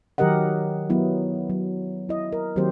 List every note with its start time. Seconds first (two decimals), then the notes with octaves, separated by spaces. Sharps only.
0.18 D#3 F#3 G4 A#4 D#5 F#5
0.90 F#3 B3 E4
1.50 F#3
2.09 E4 D#5
2.33 A#4
2.56 D#3 F#3 A#3 C4 G4 C5